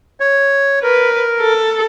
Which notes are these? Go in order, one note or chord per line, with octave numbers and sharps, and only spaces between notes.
C#5
A#4 B4
A4